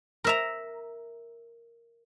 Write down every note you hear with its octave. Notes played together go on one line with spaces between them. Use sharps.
A#4 E5 A#5